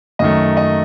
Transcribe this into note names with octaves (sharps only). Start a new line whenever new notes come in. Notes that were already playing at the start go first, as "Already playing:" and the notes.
F#2 D#3 A3 D#5
D#5